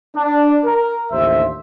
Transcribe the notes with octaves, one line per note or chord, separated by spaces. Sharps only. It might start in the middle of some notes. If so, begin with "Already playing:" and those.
D4
A#4
A1 D#2 D3 C5 E5